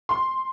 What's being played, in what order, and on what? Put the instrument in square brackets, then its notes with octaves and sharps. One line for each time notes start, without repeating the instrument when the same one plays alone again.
[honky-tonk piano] C6